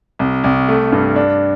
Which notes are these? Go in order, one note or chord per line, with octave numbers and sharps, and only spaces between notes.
C2
C2
A3
G2
D4